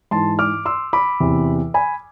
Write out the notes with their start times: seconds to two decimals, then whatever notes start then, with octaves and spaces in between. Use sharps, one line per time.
0.11 G#2 E3 A5 C6
0.39 D6 F6
0.66 C6 E6
0.93 B5 D6
1.20 E2 C3 E3
1.74 G#5 B5